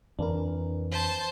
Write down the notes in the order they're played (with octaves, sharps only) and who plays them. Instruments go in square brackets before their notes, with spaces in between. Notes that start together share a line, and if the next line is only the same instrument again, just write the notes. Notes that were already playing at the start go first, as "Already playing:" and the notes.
[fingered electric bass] F2 E3 [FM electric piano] D4 A#4
[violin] C5 A5